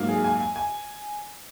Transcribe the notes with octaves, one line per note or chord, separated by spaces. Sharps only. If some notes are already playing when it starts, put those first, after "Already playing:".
Already playing: G#2 F#3 A#3
G#4
G#5
G#5
G#5